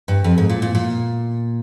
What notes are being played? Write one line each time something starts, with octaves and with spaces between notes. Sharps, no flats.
G2
F2
G#2
A#2
A#2
A#2